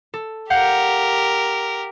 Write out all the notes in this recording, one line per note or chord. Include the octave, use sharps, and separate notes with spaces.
A4
G4 A#4 F5 F#5 G6